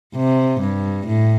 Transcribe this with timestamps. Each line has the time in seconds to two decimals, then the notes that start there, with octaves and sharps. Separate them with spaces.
0.15 C3
0.60 G2
1.07 A2